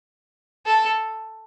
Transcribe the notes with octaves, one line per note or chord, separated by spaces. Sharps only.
A4